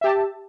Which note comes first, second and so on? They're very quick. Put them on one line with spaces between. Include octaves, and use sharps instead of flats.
E5 G4 A5